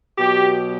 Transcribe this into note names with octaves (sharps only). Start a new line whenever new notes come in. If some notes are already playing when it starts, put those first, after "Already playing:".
B2 F#3 G4